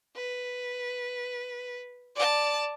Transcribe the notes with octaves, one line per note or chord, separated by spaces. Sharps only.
B4
D5 A5